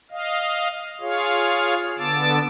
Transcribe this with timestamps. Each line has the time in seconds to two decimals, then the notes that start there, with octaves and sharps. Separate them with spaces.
0.11 D#5 F5
1.01 F4 G#4 C#5 F5
1.99 D3 B3 A5 D6 E6 A6